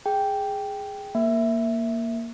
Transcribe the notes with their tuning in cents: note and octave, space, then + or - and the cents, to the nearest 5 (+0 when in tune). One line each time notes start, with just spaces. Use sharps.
G#4 +0 G5 +0
A#3 +0 E5 +0